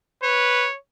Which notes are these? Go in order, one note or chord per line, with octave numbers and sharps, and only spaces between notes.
B4 C#5